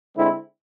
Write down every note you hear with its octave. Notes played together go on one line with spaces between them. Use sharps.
D3 G#3 C4 E4